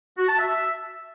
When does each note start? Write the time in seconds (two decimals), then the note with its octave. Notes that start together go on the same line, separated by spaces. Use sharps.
0.18 F#4
0.28 A5
0.39 E5